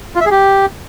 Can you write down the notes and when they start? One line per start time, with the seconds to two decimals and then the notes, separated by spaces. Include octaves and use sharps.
0.15 F4
0.21 E5
0.26 G#4
0.31 G4